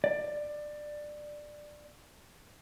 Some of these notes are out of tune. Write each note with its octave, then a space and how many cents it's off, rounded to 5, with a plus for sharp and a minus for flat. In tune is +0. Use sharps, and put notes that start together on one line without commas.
D5 +15